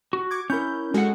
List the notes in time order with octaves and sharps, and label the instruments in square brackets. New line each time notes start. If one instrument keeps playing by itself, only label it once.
[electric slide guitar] F#4
[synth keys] C#6 D6 G#6
[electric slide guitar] C#4 E4 [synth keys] A#4 G6
[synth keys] G#3 F#4 A4 [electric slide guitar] C#4 F#5